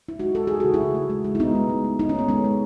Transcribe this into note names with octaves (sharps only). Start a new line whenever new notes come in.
E4
G#3 D#4 F#4
G#3 A4
E3 G#4
C#3 F#4
E4 G#4
A3
A3
G#3
G#3
E4
G#3 B3 D#4
G#3
A3
A3
A3 D#4
C#4
A3 B3
G#3 C#4
G#3